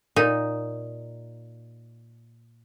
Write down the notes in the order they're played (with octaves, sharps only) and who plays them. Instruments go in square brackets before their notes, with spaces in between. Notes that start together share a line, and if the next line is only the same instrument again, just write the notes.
[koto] A#2 D#4